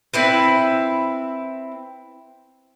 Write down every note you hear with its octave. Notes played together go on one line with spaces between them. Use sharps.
C4 E4 B4